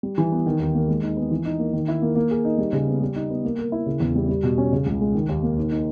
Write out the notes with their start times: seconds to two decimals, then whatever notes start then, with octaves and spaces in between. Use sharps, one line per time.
0.03 G3
0.18 E3
0.32 B3
0.46 D#3
0.59 D#2
0.75 A#3
0.88 G#3
1.03 D#4
1.17 B3
1.31 E3
1.45 D#4
1.59 A#3
1.73 D#3
1.88 E4
2.02 A#3
2.16 A#3
2.31 G#4
2.45 D#4
2.58 G3
2.73 C#3
2.88 B3
3.01 G3
3.16 D#4
3.30 B3
3.44 A#3
3.59 A#4
3.72 E4
3.86 C#3
4.00 E2
4.16 G3
4.29 G3
4.43 B2
4.58 C#4
4.72 C#3
4.86 C#2
5.01 G#3
5.15 D#3
5.29 D#2
5.43 A#3
5.58 D#3
5.72 D#4